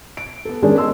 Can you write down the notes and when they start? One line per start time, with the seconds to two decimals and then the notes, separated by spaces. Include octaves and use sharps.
0.17 D7
0.45 B3 A4
0.62 D#3 G#3 B3 C#4 D4 G#4
0.78 D#5 C6 E6